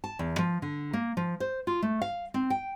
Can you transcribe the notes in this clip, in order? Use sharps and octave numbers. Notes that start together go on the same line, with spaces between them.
A5
E2
F3
D3
A#3
F3
C5
F4
A3
F5
C4
G5